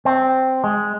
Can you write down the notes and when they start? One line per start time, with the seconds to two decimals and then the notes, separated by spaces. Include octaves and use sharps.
0.05 C4
0.64 G#3